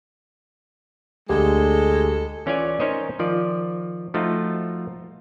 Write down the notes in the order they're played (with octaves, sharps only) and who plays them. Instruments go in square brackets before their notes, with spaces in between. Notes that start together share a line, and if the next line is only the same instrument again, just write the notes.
[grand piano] D2 [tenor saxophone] G#3 [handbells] G4 [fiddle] A4
[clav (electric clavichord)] E3 C#4 F4 C#5 D5 G#5
C#4 D#4 A#4 C5 C#5 D#5
D#3 F3 D5
F3 A3 D#4 F4 F#4